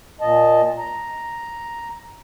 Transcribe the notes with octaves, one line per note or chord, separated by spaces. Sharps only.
A#2 D#5 A5
A#5